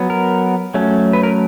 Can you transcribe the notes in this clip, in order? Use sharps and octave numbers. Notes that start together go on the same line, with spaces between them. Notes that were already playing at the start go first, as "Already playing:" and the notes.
Already playing: F#3 B3
A#4
F#3 A3 C#4
B4
A#4